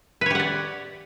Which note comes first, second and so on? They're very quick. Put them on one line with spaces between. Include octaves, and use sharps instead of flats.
B4 C#5 G4 F#5 D5